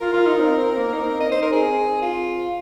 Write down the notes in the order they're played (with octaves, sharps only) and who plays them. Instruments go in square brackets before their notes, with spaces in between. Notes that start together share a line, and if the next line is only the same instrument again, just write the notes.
[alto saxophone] F4 [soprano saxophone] A#4
[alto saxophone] F4
D#4
C4
C4
A#3
D#4
C4
[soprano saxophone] D#5
[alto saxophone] D#4 [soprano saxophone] C5
[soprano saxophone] A#4
[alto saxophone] C4 [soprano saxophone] G#4
[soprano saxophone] F4